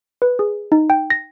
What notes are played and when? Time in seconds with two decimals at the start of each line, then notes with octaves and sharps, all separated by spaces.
0.22 B4
0.39 G#4
0.72 D#4
0.90 G5
1.10 A#6